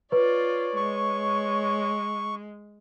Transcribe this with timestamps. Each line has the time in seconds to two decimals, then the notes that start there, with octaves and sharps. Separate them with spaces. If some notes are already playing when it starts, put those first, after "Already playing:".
0.12 F4 B4 C#5 D5
0.77 G#3 C#6